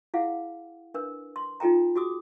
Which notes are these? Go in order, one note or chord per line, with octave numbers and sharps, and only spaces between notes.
E4 G#4 F5 F#5
D4 A#4 B4
C6
D#4 F4 A4 G5 A#5
F#4 G#4 D6 D#6